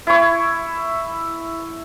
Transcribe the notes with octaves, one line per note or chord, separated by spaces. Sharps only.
E4 C#6